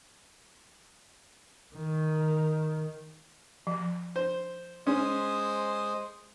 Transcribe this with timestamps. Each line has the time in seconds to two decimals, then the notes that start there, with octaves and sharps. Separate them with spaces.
1.75 D#3
3.67 F3
4.16 C5
4.87 G#3 C#4 C5 D#6